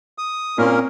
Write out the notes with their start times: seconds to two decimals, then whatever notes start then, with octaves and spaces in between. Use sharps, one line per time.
0.18 D#6
0.58 A#2 A#3 C4 C#4 A#4